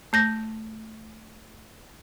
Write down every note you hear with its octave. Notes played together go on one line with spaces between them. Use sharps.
A3 G6 A#6